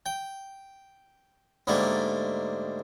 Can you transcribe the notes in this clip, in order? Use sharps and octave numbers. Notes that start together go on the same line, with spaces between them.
G5
G#2 D3 G3 A3 A#3